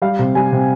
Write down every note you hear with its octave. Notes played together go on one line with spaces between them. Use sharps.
G3 F5
C3
G3 G#5
C3